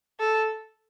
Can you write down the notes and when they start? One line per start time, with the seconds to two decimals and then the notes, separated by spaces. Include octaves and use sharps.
0.19 A4